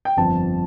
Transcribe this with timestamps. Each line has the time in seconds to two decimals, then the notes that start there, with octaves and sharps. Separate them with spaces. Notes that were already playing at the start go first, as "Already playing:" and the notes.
0.05 G5
0.17 G1 F2 F3 A5